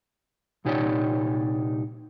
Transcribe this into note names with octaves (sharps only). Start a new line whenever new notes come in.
C2 A#2 D#4 G4 C#5 D5